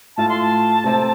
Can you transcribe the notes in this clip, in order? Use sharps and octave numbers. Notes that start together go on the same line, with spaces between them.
A2 A3 F4 A5
C6
A5
C3 A3 C4